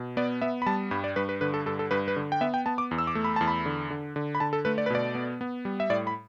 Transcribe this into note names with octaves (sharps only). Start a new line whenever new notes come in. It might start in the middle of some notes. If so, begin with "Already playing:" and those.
Already playing: B2
B3 D5
B3 E5
B5
G3 A5
G2 B5
D5
G2 B4
B4
D3 B4
A4
G2 A4
A4
G2 B4
B4
D3
G5
B3 E5
G5
B3 A5
D6
E2
E6
D6
A3
B5
E2 A5
B5
D3
D3
D3
B5
D3 A5
A4
A3 B4
D5
B4
B2 D5
B3
B3
G3
E5
A2 D5
B5